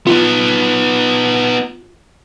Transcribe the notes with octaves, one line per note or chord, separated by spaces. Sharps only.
B3 D#4 F4